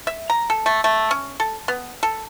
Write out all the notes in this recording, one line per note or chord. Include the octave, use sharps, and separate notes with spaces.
E5
A#5
A4
A3
A3
C#4
A4
B3
A4